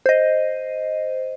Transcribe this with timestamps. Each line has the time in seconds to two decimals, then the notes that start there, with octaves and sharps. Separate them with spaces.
0.06 C5 D#5